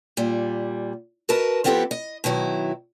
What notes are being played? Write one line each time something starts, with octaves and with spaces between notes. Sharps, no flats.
A#2 G3
F#4 A#4 B4 D#5 A5
F3 B3 C4 E4 G4 A4
D#5
B2 D#3 F#3 E4